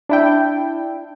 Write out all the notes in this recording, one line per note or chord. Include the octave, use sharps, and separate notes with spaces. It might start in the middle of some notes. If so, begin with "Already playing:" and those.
D4 E4 G5